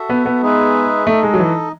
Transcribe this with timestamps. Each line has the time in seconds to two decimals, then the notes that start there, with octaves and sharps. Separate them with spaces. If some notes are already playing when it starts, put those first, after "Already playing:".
Already playing: F#4 A4 E5
0.10 B3
0.26 B3
0.42 G#3 D#4 G#4 B4 E5
1.07 A3 D#4 A4 D#5
1.23 G#3
1.34 F#3
1.39 E3